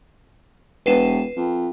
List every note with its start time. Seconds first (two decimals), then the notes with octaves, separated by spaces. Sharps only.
0.86 E1 B4 C7 E7
1.36 F2